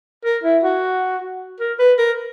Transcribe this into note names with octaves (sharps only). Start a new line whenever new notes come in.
A#4
E4
F#4
A#4
B4
A#4